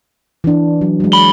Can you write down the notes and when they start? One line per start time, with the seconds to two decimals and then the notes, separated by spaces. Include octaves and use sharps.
0.44 E3 D4
0.81 F#3
1.00 F#3 G#3
1.12 B5 F#7 G7